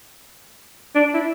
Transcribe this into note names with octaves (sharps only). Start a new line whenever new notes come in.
D4
E4